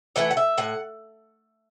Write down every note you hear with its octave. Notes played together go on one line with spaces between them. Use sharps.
E3 A3 E4 F#5
F#5
E5
A2 F#5